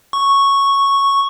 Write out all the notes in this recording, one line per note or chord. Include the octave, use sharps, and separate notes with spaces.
C#6